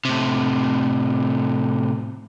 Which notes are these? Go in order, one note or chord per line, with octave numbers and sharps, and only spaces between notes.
A2 C3